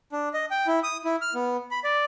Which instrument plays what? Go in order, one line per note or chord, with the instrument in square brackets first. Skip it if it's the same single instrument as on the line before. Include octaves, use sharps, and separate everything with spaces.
[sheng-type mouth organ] D4
D#5
G5
E4
D#6
E4
F6
B3
B5
D5